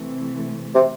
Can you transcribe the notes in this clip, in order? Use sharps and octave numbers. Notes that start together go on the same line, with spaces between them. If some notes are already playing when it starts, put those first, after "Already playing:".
Already playing: C3 E3 A3
C3